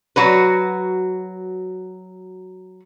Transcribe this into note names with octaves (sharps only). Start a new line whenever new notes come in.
F#3 F#4 B4